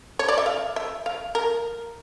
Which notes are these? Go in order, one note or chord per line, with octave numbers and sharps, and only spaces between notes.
C#5
D5
E5
F5
E5
F5
A#4